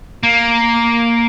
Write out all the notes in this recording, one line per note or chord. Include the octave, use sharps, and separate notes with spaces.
A#3